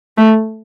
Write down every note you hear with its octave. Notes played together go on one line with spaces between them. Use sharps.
A3